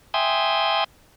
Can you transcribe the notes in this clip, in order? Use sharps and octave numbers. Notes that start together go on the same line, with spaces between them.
E5 G5 G#5 C6 D#6